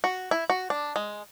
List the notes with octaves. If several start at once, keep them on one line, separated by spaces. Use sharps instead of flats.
F#4
E4
F#4
D4
G#3